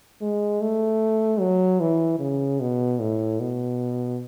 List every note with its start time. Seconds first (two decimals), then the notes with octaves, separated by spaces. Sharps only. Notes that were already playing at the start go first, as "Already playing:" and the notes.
0.21 G#3
0.61 A3
1.40 F#3
1.80 E3
2.19 C#3
2.60 B2
2.99 A2
3.40 B2